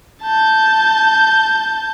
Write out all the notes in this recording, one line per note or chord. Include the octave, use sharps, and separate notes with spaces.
A5 G6